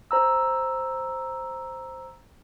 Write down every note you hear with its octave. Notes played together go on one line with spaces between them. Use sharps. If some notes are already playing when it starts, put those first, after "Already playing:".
C5 A#5 E6